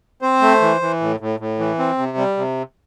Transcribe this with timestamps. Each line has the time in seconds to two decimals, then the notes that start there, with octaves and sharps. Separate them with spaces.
0.22 C4 C5
0.42 A3
0.61 E3
0.81 E3
1.01 A2
1.20 A2
1.40 A2
1.59 E3
1.79 C4
1.98 C3
2.17 G3
2.37 C3